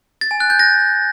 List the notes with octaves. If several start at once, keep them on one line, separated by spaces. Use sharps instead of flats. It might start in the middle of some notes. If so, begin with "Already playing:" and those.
A6
G#5
F#6
G6
A#6